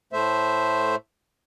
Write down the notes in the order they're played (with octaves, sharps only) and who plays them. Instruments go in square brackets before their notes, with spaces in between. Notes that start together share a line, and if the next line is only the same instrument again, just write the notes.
[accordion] A2 A3 C5 E5